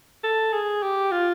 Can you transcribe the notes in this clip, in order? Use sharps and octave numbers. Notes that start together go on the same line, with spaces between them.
A4
G#4
G4
F4